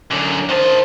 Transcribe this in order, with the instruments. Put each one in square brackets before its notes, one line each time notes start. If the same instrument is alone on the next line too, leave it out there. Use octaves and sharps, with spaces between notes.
[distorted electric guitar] F#2 D3
[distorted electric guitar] D#3 A5 [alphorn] C5